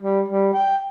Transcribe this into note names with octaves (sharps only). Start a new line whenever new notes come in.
G3
G3
G5